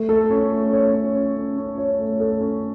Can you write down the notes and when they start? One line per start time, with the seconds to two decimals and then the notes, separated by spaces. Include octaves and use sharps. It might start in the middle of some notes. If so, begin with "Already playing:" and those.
Already playing: A3
0.09 A4
0.30 C#4
0.51 A3
0.73 C#5
0.93 C#4
1.15 C#4
1.36 C#4
1.58 C#4
1.78 C#5
1.98 A3
2.20 A4
2.41 C#4